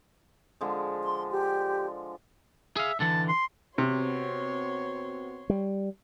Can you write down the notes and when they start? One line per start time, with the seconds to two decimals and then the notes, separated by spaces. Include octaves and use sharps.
0.61 D3 F3 G#3
1.03 C6
1.32 G4
2.76 G#4 E5 F5
3.00 D3 E3 A5
3.29 C6
3.78 C3 B3 C4 F#4 C#5 C6
5.50 G3